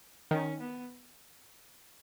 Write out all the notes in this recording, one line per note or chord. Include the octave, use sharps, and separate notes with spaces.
D#3 C#4
B3